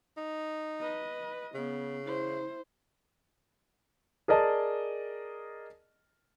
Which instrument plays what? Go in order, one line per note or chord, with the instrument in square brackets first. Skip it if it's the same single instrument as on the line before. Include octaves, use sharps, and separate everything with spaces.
[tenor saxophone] D#4
[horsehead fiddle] B4 D#5
[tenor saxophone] C#3 [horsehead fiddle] B3
[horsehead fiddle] E4 C5
[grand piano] G#4 A#4 D5 D#5 A5